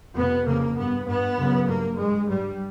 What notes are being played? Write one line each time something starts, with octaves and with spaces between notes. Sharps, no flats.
F2 C3 B3
F2 C#3 A#3
G2 B3
G2 B3
F#2 C#3
G2 A#3
G2 G#3
G2 G3